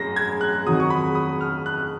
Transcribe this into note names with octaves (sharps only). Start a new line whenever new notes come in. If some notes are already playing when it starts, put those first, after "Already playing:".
Already playing: F#2 G#3 A#6
G#6
F#6
F2 D#3 F#3 D#6
C#6
B5
D#6
F6
F#6